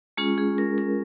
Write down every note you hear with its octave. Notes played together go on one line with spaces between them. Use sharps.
G#3 C#4 F4 G#4
G#4
A#4
A#4